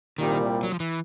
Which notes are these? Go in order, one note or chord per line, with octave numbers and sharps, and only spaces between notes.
C2 A#2 D#3 G3
F#3
F3
E3